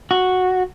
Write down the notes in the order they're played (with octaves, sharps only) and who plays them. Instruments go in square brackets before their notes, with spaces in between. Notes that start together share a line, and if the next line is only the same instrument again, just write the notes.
[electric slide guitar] F#4